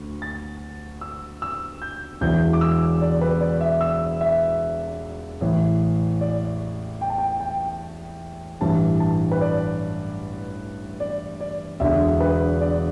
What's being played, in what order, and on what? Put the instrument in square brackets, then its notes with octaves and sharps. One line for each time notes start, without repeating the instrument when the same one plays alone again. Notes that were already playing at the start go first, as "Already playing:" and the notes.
Already playing: [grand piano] D2
A6
E6
E6
G6
E1 E2 E3 G6
D6
E6
D5
B4
D5
E5
E6
E5
A1 A2 E3
D5
G5
A5
G5
G5
A1 G2 E3 A5
A5
B4
D5
D5
D5
E1 E2 D3 E5
B4
D5